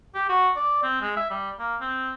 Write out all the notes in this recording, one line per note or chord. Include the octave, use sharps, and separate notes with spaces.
G4
F#4
D5
C4
G#3
E5
G3
A#3
C4